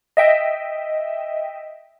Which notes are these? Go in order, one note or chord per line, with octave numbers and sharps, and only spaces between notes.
D#5 E5 G5